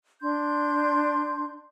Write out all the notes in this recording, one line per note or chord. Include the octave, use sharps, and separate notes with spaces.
D4 C6 G6